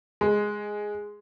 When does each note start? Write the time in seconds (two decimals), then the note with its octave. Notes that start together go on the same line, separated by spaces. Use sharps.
0.21 G#3